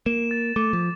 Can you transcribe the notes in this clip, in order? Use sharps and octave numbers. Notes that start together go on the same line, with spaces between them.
A#3 E7
A6
A3 D6
F3